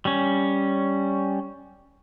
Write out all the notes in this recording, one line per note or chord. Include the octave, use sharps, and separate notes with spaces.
G3 C#4